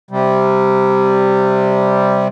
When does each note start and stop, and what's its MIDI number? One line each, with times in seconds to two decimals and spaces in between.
0.11 2.28 48
0.11 2.28 55